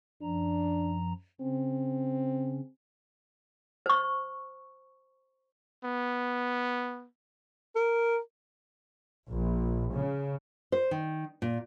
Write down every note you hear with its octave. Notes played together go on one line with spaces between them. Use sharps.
F#2 F3 D4 A#5
C#3 C4 C#4
C5 C#6
B3
A#4
A#1
C#3
C5
D#3
A#2